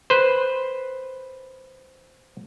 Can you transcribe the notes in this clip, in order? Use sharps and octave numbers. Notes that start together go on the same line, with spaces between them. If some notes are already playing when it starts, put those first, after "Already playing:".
B4 C5